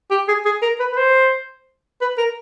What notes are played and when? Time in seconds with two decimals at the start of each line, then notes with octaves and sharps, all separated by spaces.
0.11 G4
0.28 G#4
0.45 G#4
0.62 A#4
0.79 B4
0.92 B4
0.97 C5
2.01 B4
2.18 A#4